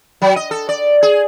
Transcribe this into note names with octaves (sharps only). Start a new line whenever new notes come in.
F#3
D#5
A4
D5
G#4